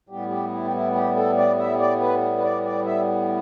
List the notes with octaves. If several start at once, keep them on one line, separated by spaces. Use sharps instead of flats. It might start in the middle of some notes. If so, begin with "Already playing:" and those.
A2 G3 B3 G4
G4
E4
G4
E4
G4
A4
D5
E5
D5
B4
B4
D5
D5
E5